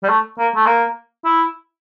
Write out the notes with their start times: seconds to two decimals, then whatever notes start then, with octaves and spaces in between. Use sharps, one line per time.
0.03 G3
0.10 A3
0.38 A#3
0.56 A3
0.66 A#3
1.25 E4